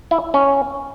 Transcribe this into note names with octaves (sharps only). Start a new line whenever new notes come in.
E4
C#4